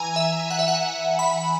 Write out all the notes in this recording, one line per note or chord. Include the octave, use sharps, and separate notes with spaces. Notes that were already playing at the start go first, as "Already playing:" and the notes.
Already playing: E3 G#5 A#5
E5
F#5
E5
F#5
B5